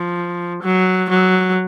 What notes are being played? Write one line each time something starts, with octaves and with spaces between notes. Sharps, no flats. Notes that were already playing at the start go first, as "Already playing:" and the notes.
Already playing: F3
F#3
F#3